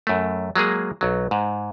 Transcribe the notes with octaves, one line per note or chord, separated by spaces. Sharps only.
F#2 A3
F#3 G#3 A#3 G#4
B1 F#3
G#2